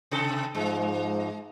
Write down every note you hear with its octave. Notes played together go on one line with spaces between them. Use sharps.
C3 A4
G#2 F3 G#3